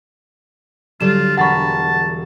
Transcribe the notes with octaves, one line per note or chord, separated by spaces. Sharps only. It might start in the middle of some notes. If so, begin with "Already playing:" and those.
D3 F#3 G3 F4 E7
E1 A#4 F#5 A5 B5 C#6